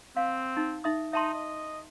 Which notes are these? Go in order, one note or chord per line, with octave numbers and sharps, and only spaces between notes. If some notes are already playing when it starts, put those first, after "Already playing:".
C4 F5
D#4
D#4 E5 D#6
D#4 E5 A5 C6
D#5